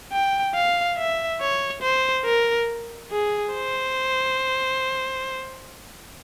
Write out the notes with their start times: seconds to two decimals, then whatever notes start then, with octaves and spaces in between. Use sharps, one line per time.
0.12 G5
0.55 F5
0.98 E5
1.41 C#5
1.83 C5
2.25 A#4
3.12 G#4
3.54 C5